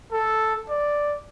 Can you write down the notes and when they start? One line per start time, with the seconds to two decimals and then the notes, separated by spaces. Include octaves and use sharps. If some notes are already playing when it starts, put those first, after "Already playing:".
0.12 A4
0.69 D5